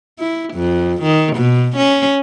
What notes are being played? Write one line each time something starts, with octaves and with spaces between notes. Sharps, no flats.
E4
F2
D#3
B2
C#4